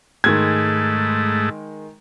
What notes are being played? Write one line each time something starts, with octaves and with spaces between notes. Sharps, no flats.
G#2 D#3 G#3 A3 G#6